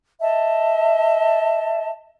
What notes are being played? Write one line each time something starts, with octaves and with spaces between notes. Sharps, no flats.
D#5 E5 A5